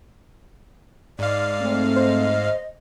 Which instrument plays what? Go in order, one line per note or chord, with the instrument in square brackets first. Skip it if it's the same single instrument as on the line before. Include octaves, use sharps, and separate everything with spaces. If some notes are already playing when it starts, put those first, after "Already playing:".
[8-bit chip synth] G#2 F5 [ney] D5
[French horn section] A3 C4
[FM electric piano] C5 [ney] D#5